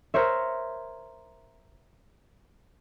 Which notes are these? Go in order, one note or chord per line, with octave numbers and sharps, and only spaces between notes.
A#4 C5 C#5 E5